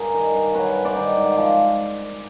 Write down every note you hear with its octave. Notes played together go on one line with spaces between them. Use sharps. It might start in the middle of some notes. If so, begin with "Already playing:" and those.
Already playing: G2 G#4 A#4
D#3
G2
F#3 B4 C#5
G2
C5 D5
D#3
G#2
F3